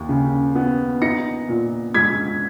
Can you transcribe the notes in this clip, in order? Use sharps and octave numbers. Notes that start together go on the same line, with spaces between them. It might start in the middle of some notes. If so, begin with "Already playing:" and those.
Already playing: D#2
C#3
B3
D#4 A#6 C#7
A#2
G#3 G#6 B6